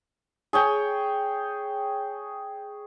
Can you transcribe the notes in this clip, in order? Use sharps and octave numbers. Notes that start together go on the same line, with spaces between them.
G#4 C#5 G5